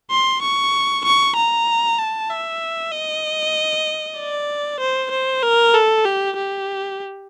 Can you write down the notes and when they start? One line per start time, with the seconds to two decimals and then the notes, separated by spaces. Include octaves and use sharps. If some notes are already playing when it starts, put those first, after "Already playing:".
0.11 C6
0.42 C#6
1.05 C#6
1.36 A#5
1.98 A5
2.30 E5
2.92 D#5
4.18 D5
4.80 C5
5.11 C5
5.43 A#4
5.75 A4
6.05 G4
6.37 G4